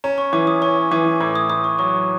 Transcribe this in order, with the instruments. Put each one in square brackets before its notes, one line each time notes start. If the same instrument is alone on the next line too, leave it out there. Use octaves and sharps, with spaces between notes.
[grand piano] C#4 [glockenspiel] A#5
[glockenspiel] C#6
[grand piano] E3 [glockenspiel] D6
[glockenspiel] D#6
[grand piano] C#4 [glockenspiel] C#6
[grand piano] E3 [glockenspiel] D6
[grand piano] A2 [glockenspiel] D6
[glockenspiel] D#6
[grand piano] A2 [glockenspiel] D#6
[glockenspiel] C#6
[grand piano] F#3 [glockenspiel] C#6